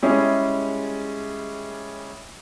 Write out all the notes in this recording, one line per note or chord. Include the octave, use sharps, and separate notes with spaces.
G3 G#3 C#4 E4 G#4